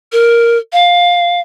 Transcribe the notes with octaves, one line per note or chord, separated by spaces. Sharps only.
A#4
F5